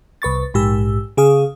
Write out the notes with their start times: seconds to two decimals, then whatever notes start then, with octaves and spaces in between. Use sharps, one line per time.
0.22 C2 B4 C#6 A6
0.54 A#1 G#2 G4 E6
1.17 C#3 G#4 F5 D#6